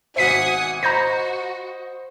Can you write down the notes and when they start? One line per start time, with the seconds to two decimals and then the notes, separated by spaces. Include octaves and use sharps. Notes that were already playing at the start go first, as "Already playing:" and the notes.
0.16 G#1 B2 C5 E5 F#5 G#5 D#6 B6
0.83 F#4 C5 D#5 A#5 B5 G6 A#6